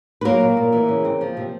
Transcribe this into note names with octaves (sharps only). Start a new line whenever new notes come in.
B4
F#3 A#3 A#4
A#2
A#2
E3
C#3
C4
F3
C3